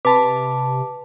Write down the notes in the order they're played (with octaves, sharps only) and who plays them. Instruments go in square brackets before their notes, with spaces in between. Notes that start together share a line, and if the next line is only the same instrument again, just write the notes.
[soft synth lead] C3 [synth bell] B4 A5 B5 [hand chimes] D6